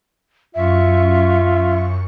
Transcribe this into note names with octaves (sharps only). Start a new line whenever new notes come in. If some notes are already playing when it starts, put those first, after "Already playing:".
F#2 F4 E5 C#6